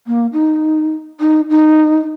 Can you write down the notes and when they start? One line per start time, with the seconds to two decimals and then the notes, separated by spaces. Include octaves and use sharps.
0.07 A#3
0.33 D#4
1.20 D#4
1.50 D#4